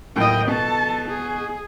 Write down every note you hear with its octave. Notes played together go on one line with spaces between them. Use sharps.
D#2 A2 F#3 D#5 G5
B2 A4 A5
G#4